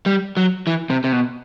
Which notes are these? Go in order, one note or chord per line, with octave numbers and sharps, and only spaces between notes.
G3
F#3
E3
C3
C3
B2